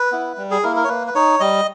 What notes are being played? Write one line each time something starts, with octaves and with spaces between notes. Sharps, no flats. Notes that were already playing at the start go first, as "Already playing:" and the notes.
Already playing: B4
B3 E4
G3
G#4
A#3 E4 A#4
A#4
C#5
A#3 B4
B4
D#4 C#5
G3 D#5